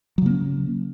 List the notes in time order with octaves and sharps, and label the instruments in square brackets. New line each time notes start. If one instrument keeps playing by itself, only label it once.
[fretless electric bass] F#3
C#3
A#3
C#4